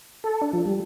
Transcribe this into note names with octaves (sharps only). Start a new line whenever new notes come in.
A4
D4
F3
G3